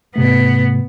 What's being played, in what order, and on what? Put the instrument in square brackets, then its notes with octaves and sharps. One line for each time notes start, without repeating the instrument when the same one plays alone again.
[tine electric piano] G#2 C3 A3 [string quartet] B3